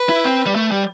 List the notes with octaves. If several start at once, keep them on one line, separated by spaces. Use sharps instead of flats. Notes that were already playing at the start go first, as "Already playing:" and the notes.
Already playing: B4
E4
C4
G3
A3
G3